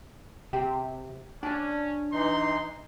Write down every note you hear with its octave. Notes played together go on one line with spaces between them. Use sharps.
C3 G4
C#4 D4 G#5 A5
E3 D#4 C6